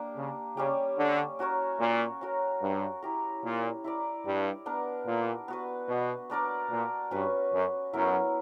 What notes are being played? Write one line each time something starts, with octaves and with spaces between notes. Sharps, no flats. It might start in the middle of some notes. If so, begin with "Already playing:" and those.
Already playing: A#3 D4 G4
C#3
C#3 G3 C#4 G4
D3
C#4 F#4 A#4 C#5
A#2
C#4 F#4 A#4
G2
E4 G4 A#4
A#2
E4 A#4 D5
G2
B3 D4 A#4
A#2
B3 F#4 B4
B2
B3 D4 A#4 D5
A#2
G2 C#4 F#4 B4
F#2
F#2 F#3 B3 E4 A#4